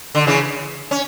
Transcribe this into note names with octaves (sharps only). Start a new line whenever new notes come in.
D3
C#3 E3
C#4